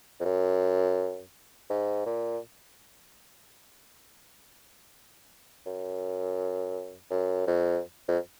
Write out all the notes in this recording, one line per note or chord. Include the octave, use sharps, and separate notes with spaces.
F2
F#2
G#2
A#2
F#2
F#2
F2
F2